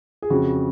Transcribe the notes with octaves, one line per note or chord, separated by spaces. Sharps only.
G#4
F2 C#3 F#4